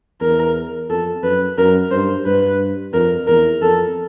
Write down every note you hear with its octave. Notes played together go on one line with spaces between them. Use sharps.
E2 A#4
F2 A4
F#2 B4
F#2 A#4
G2 C5
G2 B4
F2 A#4
E2 A#4
F2 A4